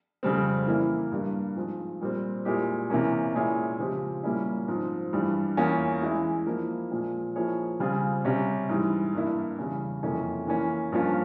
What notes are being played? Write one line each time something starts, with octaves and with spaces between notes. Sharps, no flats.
F2 C#3 G3 C4
E3 A#3 E4
G2 G3 A#3
G#2 F3 G#3 C4
A#2 G3 C4
A#2 G#3 E4 G4
C3 E3 A#3 C#4
A#2 G#3 E4 G#4 C#5
C#3 F3 G#3 C4 G4
A#2 G3 A#3 C#4 E4
G#2 F3 C4
G2 E3 G3
E2 E3 A#3 C#4 F4
E3 G#3 E4
F3 A#3 E4
A#2 F3 G#3
F3 A#3 E4 G#4 C#5
C#3 G3 C4 F4 G#4
C3 G3 C#4
G#2 E3 G3
G2 E3 A#3 E4
E2 C#3 G3 C#4
F2 C3 E3 A#3 C#4
E3 A#3 C#4
G2 F3 A#3 C#4 F4